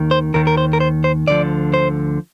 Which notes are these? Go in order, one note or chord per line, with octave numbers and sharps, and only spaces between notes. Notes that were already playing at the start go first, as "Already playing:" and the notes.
Already playing: D#2 D#3
C5
D#2 D#3 A#4
A#4
C5
A#4
C5
C5
D2 D3 F3 D5
C5